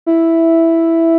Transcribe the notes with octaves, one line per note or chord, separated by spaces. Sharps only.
E4